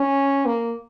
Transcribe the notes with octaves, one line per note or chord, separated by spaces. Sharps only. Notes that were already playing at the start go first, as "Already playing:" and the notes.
Already playing: C#4
A#3